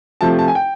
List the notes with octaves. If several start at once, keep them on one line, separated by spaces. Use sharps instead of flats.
C3 F3 A3 A5
A5
G#5
G5